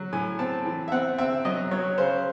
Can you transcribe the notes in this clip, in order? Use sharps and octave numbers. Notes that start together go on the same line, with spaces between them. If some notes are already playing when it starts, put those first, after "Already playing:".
Already playing: F#3
A2 G#5
C4 A5
E3
E5
C4 F#5
C4 E5
F#3 D#5
F#3 C#5
C#3 C5